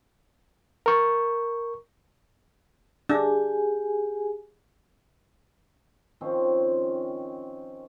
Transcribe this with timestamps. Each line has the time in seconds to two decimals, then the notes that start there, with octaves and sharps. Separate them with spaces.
0.86 A#4 C#6
3.09 D4 G4 G#4 G#5
6.21 D#3 F3 C4 C#4